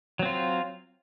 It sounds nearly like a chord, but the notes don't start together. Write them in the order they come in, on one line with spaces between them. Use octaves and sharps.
F#3 C4 F4